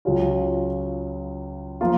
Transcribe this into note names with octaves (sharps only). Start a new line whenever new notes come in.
C#2 C#3 F#3 C#4 F4
F3 A#3 F4